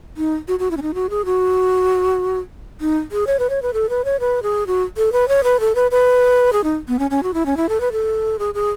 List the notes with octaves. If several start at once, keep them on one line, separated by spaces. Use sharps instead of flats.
D#4
F#4
F#4
E4
C#4
D#4
F#4
G#4
F#4
D#4
G#4
C#5
B4
C#5
B4
A4
B4
C#5
B4
G#4
F#4
A4
B4
C#5
B4
A4
B4
B4
G#4
D#4
B3
C#4
C#4
F#4
E4
C#4
E4
A4
B4
A4
G#4
G#4